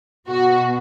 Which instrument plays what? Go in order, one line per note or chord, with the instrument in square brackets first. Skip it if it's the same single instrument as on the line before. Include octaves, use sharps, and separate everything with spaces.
[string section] B2 F#4